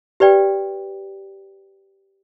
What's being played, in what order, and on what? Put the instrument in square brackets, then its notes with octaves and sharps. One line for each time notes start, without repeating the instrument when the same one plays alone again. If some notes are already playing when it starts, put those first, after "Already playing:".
[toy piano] G4 B4 D5 G5